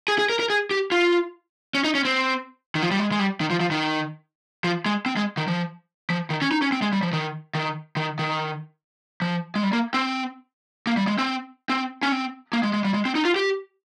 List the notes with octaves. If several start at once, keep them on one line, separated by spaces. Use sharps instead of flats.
G#4
G#4
A#4
A#4
G#4
G4
F4
C#4
D#4
C#4
C4
D#3
F3
G3
G#3
G#3
G3
D#3
F3
F3
D#3
F3
G#3
C4
G#3
D#3
F3
F3
D#3
C#4
D#4
C#4
C4
G#3
G3
F3
D#3
D#3
D#3
D#3
F3
G#3
G3
A#3
C4
A#3
G3
G#3
C4
C4
C#4
C4
A#3
G#3
G#3
G3
G#3
C4
D#4
F4
G4